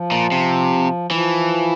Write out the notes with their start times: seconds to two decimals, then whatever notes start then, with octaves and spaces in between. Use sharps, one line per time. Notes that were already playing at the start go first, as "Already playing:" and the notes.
Already playing: F3
0.12 A#2
0.32 C3
1.11 E3 F3